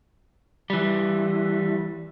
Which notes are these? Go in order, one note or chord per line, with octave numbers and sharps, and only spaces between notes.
E3 G3